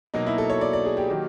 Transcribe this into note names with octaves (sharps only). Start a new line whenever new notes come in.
B2 F#3 A#3 D#4
E4
A4
C#5
D5
D5
G#4
G4
D#3 F#3 A#3